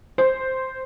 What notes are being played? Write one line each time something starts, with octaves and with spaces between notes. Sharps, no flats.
C5